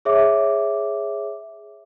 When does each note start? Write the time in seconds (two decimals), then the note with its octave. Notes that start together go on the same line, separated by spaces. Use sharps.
0.05 G#4 C#5 E5 D6